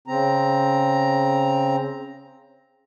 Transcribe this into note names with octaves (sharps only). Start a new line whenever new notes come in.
C#3 C4 A#5